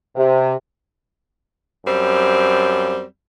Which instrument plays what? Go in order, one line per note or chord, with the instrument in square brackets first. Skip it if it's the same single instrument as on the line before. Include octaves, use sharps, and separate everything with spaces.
[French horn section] C3
[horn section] F#2 G3 C4